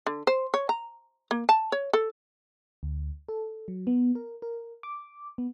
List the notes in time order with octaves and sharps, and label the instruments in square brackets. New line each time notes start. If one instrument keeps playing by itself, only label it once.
[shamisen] D3
C5
C#5
A#5
A#3
A5
C#5
A4
[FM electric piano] D2
A4
F#3
B3
A#4
A#4
D6
B3